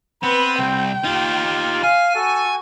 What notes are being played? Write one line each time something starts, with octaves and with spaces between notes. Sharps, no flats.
B3 C4 B4
C2 G5
D#4 F4 G4
F5 G#5
F#4 A4